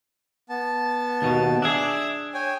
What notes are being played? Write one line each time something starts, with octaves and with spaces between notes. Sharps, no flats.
B3 A5
D#2 B2
D4 G#4 E5 D6 E6
C#5 G5 G#5